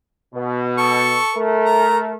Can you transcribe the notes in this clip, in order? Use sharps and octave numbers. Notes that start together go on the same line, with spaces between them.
B2
A4 C#6
A3 A#4
A#5